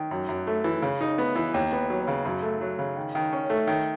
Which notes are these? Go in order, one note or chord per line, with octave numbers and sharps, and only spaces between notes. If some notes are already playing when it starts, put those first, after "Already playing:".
Already playing: D#3
F#2
F#2
A3
E3
C#3
D#4
B3
E3
D#2
B3
F#3
C#3
F#2
A3
F#3
C#3
D#3
D#3
C#4
A3
D#3